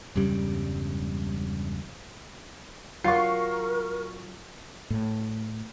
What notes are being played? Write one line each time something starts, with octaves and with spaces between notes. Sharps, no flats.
E1 G2 C#3 G3
F#3 F4 F#4 A#4 C#6 C7
A2